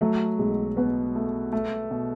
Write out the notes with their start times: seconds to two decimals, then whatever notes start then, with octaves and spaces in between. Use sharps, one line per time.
0.01 F#3 A3
0.38 B1 G#3
0.77 B2 B3
1.15 A3
1.53 A3
1.91 B2